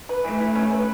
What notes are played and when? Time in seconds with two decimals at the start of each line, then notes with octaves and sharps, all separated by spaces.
0.09 B4
0.24 E3 A3
0.40 E4
0.55 C#4
0.71 B4